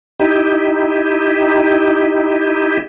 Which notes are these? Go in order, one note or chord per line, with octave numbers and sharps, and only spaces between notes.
D#4 E4 G4